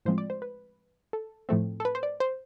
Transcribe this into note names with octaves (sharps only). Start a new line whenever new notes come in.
A2 F3 G#3 C4 C5
D5
C5
B4
A4
A2 F3 A3 C4
A4
B4
C5
D5
C5